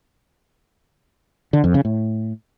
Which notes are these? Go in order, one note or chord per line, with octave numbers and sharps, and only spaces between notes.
D3
F2
C#3
A2